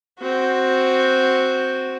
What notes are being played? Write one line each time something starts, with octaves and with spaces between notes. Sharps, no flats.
C4 F#4